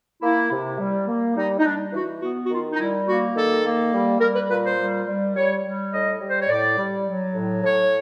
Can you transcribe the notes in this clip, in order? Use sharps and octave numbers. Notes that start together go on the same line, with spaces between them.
A#3 E4
C3
G3
A#3
G3 D#4
D#4
G3 D4
E3 F#4
B3 F#4
F#4
D#3 F4
D#4
G3 E4
A#3 F#4
D#3 A4
A#3
G3
G3 A#4
B4
A#2 B4
C5
G3
G3
G3 C#5
G3
A2 D#5
G3
C5
C#5
A2 D5
G3
F#3
A2
A2 C#5